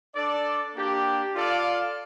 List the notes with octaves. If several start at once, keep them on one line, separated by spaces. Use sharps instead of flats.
D4 A4 D5
A#3 D4 G4
F4 A4 D5 F5